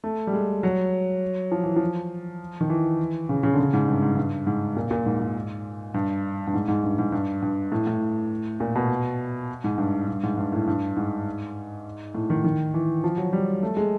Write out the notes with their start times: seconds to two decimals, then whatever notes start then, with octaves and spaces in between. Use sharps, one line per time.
0.04 A3
0.27 G3
0.33 G#3
0.63 F#3
1.51 F3
1.64 E3
1.76 F3
2.61 D#3
2.70 E3
3.29 C#3
3.43 C#3
3.54 D3
3.58 C#3
3.73 G#2
3.88 G2
4.02 G#2
4.17 G2
4.47 G#2
4.76 A#2
4.91 A#2
5.06 G#2
5.21 G#2
5.94 G2
6.47 G2
6.54 G#2
6.68 G#2
6.84 G2
6.98 G#2
7.12 G2
7.42 G2
7.72 A2
7.87 A2
8.60 A#2
8.75 B2
9.64 G#2
9.78 G2
10.08 G2
10.23 G#2
10.37 G2
10.52 A2
10.67 G2
10.97 G#2
12.15 A2
12.30 D#3
12.44 D#3
12.74 E3
13.04 F3
13.17 F#3
13.33 G3
13.63 A3
13.77 G#3